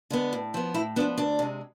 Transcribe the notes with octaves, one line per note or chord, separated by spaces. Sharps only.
D3 G#3 B3
A2
F3 B3
A2 E4
F3 B3 D4
D2 D4
C3 G#3